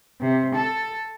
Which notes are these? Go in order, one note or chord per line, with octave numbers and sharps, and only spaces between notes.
C3
A4